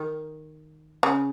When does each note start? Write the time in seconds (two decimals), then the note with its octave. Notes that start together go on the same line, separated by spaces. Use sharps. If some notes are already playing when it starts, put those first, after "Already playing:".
Already playing: D#3
1.03 C#3